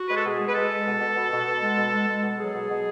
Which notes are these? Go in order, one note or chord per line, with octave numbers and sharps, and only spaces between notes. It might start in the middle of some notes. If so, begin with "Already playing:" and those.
Already playing: F#4
G#3 B4
A4
B2 G#4
G#3
B4
G#3 A4
G#3
B2
B2
B2
B2
B2
G#3
B2
G#3
G#3
B2
F#3 G#4
B2
B2